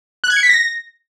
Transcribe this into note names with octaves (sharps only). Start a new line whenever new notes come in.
F#6
G#6
C#7
B6
A#6